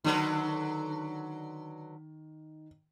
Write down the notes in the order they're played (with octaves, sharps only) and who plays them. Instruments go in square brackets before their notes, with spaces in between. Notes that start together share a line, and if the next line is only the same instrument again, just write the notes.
[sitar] D3 F#3 B4 [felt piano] D#3